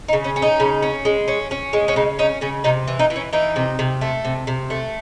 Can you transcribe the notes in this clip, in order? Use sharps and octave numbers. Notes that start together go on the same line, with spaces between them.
D#4
C#3
C#4
C#4
D#4
C#3
C#4
G#3
C#4
C#4
G#3
C#4
C#3 D#4
C#4 D#4
C#3 C#4
C3 D#4
E3
D#4
E3
C#4
E3 D#4
C3
C3
A3
C3
C3
A3